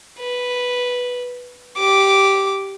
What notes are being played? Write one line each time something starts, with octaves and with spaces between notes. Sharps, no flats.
B4
G4 D6